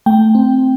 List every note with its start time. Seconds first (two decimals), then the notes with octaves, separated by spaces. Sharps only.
0.06 A3 G5
0.35 C4